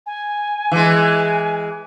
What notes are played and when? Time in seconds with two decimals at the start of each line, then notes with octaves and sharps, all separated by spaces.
0.06 G#5
0.72 E3 G#3